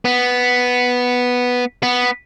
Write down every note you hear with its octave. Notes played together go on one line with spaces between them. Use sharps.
B3
B3